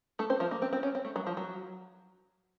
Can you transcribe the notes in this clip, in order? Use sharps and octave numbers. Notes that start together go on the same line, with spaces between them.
A3 A4
C4 C5
F3 F4
A#3
C4
C4
C#4
C4
A3
F#3
F3
F#3